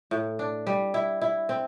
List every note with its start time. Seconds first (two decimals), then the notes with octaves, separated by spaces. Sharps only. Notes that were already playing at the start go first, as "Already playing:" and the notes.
0.11 A2
0.39 D4
0.67 G3
0.94 E4
1.21 E4
1.49 C4